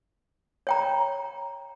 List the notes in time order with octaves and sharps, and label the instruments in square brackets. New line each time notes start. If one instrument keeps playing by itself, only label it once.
[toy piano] C#5 G5 A#5